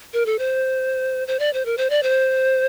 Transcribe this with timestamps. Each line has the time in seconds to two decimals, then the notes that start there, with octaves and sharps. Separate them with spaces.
0.14 A#4
0.26 A4
0.39 C5
1.28 C5
1.39 D5
1.53 C5
1.66 A#4
1.77 C5
1.90 D5
2.03 C5